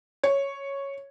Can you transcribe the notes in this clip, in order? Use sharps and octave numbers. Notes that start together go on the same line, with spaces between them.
C#5